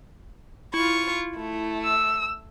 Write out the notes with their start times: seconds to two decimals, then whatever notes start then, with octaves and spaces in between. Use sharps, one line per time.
0.74 E4 F4 C#6
1.36 A3
1.84 E6